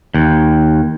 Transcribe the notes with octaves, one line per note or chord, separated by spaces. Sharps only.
D#2